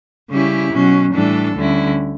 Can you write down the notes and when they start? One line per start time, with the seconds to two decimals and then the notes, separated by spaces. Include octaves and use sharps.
0.30 C#3 G3 C#4 E4 G4
0.71 B2 F#3 C#4
1.13 A2 E3 G3 D4 A4
1.55 D2 D3 G3 C#4 E4